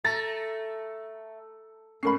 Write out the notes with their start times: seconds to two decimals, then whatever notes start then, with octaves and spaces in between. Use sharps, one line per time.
0.04 A3 A#5 A6 A#6
2.03 G#2 A3 C#4 A#4 B5 C7